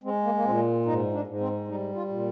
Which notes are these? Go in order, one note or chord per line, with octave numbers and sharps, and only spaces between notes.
G#3 C4
A#3
A#3
A#2 C4
G#2 D#4
D4
G#2
C4
G3 D#4
F4
A#2